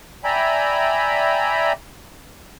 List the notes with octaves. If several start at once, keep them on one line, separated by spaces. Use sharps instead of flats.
D5 E5 G5 G#5 A#5 B5